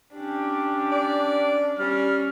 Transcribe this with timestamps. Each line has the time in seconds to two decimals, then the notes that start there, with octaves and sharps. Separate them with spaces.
0.14 C#4 D4 G4
0.92 D5
1.79 G3 C#4 F6